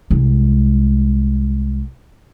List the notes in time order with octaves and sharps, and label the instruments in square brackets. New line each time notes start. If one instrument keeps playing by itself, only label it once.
[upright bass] C2 G#3